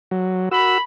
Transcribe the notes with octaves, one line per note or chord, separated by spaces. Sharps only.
F#3
F#4 A#4 B5 E6